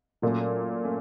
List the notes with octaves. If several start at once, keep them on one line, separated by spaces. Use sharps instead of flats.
A#2 F#3 A3 C#4
A3 C#4